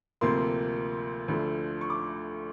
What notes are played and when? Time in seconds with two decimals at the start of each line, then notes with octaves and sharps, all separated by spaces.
0.21 D2 C3 F3 A#3 C6
1.28 D2 D3 F3 A3
1.81 C#6
1.90 D6